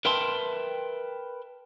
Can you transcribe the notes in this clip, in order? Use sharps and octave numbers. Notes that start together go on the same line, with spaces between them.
A#4 B4 E5 G5 A5 C6